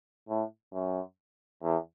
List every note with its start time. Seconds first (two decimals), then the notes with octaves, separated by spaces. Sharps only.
0.29 A2
0.73 F#2
1.63 E2